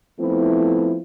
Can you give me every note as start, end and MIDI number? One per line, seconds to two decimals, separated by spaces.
0.20 0.98 53
0.20 0.98 57
0.20 0.98 59
0.20 0.98 60
0.20 0.98 64